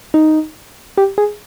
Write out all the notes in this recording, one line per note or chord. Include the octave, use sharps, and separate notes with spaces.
D#4
G4
G#4